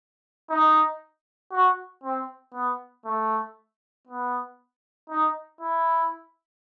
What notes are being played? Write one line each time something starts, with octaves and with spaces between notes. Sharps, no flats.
D#4
F#4
C4
B3
A3
B3
D#4
E4